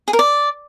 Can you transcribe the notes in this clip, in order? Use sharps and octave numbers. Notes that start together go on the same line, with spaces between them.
G#4
A#4
D5